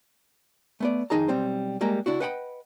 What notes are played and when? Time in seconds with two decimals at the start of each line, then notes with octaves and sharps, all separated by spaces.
0.80 A3 B3 D5
1.10 F2 D#3 D#4 G#4 A5 A#5
1.28 B1 G3 C4 C5
1.81 G3 G#3 A#3 G4 A#5
2.06 C#2 D4 E4 F#4
2.20 B4 D#5 F#5 G5 A5 B5